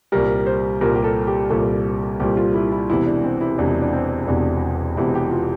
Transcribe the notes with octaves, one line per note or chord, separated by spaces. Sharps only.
C2 A#2 G3 A#4
C5
C2 A#2 G3 A#4
G4
A4
G4
C2 A#2 G3 A4
C2 A#2 G3 G4
F4
E4
E4
E1 E2 C3 E4
D4
C4
E4
E1 E2 C3 D4
E4
D4
C4
E1 E2 C3 D4
E1 E2 C3 E4
G4
F4